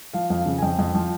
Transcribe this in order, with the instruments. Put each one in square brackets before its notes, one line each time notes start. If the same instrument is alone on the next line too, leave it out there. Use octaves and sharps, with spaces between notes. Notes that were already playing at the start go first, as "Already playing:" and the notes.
[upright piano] F3 F5
F2 F5
C#3
G#5
F2 G5
F2
F3